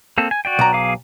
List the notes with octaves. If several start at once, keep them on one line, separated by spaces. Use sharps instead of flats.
A#3 C4 A4
G#5
F#4 D5 G5
B1 A#5
G#4 F5 D6